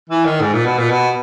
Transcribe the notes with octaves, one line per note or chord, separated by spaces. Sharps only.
E3
D#3
G#2
A#2
B2
A#2
B2